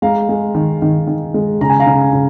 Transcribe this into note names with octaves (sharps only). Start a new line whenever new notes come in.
G#3 F5 A#5
G#3
D#3
D#3
D#3
G#3
C#3 A#5
G#5
F5 A#5
C#3
C#3